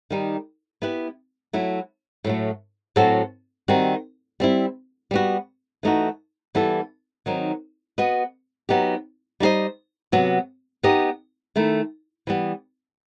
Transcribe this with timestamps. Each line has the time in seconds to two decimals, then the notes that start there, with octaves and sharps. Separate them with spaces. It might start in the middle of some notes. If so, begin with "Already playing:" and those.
0.10 D#3 G3 D#4
0.82 B3 E4 G4 B4
1.53 F#3 A3 E4
2.24 A2 F#3 A3
2.96 A2 F#3 C4 F#4 A4
3.68 D#3 G3 C4 F#4
4.40 G3 C4 E4
5.11 G3 B3 F#4
5.83 E3 A3 D#4 F#4
6.55 E3 G3 B3 E4 A4
7.26 D#3 F#3 C4 D#4
7.98 B3 F#4 B4 D#5
8.69 F#3 B3 D#4 G4
9.40 G3 D#4 G4 C5 D#5
10.12 C3 F#3 B3 F#4
10.83 B3 D#4 G4 D#5
11.56 D#3 A3 E4
12.27 E3 G3 B3